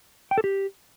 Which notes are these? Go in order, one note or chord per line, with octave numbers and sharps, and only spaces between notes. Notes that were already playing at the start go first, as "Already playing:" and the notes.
G5
A4
G4